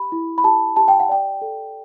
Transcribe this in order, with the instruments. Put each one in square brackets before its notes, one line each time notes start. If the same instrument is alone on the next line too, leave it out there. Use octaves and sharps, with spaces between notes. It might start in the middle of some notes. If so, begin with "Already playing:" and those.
Already playing: [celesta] G4 B5
E4
B5
G4 A5
G4 A5
G5
F#5
D5 G5
A4